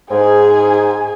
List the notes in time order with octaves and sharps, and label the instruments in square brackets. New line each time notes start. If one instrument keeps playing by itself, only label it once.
[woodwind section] G#2 [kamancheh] G#4 G#5